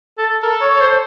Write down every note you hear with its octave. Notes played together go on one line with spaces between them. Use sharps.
A4
A4 A#4
C#5
C#5
C5